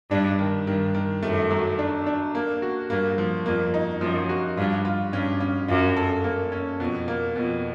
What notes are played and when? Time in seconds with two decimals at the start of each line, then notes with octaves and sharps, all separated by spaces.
0.11 G2 D4
0.39 D#3
0.67 G2 D#3
0.94 D#3
1.23 F#2 A3
1.51 F#3
1.79 D4
2.06 D4
2.35 A#3
2.62 F#4
2.90 G2 A#3
3.18 F3
3.46 F2 A#3
3.74 D#4
4.01 F#2 F3
4.29 F#4
4.57 G2 F4
4.85 F4
5.13 G2 C#4
5.40 C#4
5.68 F#2 F4
5.97 A4
6.24 A#3
6.52 C#4
6.80 F2 B2
7.08 A#3
7.36 F2 B2